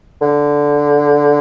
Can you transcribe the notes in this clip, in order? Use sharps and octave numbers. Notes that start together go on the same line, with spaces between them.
D3